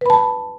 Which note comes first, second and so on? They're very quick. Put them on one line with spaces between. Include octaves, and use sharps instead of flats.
B4 B5 A5